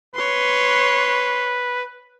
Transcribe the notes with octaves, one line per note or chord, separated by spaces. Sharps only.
B4 C#5 C6